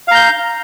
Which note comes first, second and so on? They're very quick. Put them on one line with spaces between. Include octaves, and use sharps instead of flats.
F5 A#5 G6